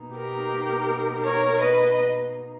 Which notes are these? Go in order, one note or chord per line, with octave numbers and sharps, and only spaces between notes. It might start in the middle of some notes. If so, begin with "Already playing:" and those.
Already playing: B2 A#3 D#4
G4 A#4
A#4 C#5
B4 D#5